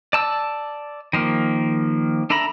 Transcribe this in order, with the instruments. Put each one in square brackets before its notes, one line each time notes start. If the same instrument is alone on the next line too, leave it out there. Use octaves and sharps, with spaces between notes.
[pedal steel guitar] D5 A5 E6
D#3 F3 A#3
D4 A4 E5 A#5 B5